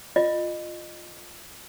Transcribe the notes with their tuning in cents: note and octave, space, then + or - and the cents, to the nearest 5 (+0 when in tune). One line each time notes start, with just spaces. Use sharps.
F4 +0 D#5 -25